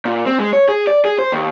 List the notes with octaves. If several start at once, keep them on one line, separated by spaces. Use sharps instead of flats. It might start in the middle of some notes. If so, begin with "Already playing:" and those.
A#2
C4
G#3
C#5
G#4
D5
G#4
C5
D#2